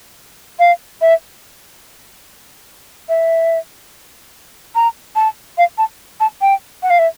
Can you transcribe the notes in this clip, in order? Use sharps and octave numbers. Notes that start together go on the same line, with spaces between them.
F5
E5
E5
A#5
A5
F5
A5
A5
G5
F#5
F5
E5